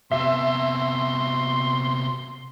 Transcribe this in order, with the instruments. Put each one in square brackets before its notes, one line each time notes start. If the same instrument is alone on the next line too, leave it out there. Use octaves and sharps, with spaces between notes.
[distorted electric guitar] C3 B3 [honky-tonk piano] E5 [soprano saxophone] C6